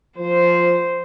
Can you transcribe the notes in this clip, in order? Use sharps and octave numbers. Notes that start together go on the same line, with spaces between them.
F3 C5